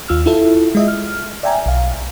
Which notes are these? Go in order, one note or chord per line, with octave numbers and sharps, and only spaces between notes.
D#2 F4 E6 F6
E4 F4 A4 E5
G#3 D#5 E5
F6
D5 E5 G5 G#5 A#5
B1 F5